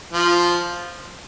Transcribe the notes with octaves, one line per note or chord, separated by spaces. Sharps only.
F3